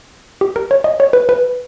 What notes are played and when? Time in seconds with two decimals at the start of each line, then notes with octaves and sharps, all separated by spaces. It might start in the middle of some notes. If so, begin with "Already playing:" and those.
0.41 G4
0.56 A#4
0.71 C#5
0.84 D#5
1.00 C#5
1.13 B4
1.29 B4